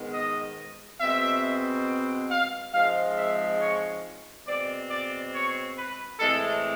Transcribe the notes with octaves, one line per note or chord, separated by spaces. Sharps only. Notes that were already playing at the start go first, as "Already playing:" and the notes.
Already playing: G#2 D#3 G#3 B3
D#5
B2 G#3 C4 E5
F5
G#2 F3 G#3 C4 F5
E5
C#5
B2 G#3 C4 D5
D5
C#5
B4
A2 E3 G#3 C4 A4